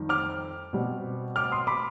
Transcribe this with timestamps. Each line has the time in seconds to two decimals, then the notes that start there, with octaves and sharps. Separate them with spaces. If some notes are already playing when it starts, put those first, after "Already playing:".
Already playing: F2 D#3 G3
0.09 D6 F6
0.73 B2 G3 C4
1.36 D6 F6
1.52 C6 D#6
1.67 B5 D6